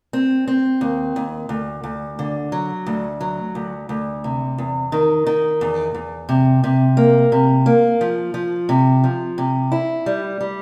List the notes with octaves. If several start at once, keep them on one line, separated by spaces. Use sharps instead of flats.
C4
C4
D#2
D#2
D2
D2
D3
F#3
D2
F#3
D2
D2
C3
E2
D#3
D#3
E2
E2
C3
C3
A#3
C3
A#3
F3
F3
C3
F3
C3
E4
G3
G3